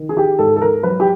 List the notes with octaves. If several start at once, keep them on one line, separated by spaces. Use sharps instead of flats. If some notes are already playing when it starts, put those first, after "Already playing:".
Already playing: D#3
G#4
G4
G#2 A4
A4
A#4
F#3 B4
G4